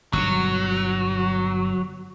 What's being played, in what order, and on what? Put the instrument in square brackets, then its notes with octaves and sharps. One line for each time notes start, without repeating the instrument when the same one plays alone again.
[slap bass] G1 B2 [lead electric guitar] F#3